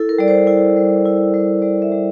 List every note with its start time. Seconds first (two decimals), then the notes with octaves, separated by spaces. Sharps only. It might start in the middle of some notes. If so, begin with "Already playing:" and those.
Already playing: E4 A4
0.09 A#4
0.18 G3 D5
0.28 C5
0.47 E4
0.77 G3
1.06 E4
1.34 G3
1.62 G3 D5
1.82 E5
1.92 G3